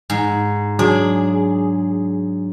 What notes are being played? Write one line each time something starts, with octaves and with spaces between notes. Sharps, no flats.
G#2
F#3 D4 G#4